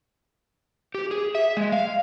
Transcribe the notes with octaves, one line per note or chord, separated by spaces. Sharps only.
G4
G#4
E5
G#3
F5